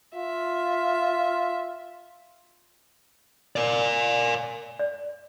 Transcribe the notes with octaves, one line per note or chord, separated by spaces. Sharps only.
F4 E5
A#4 D5
D5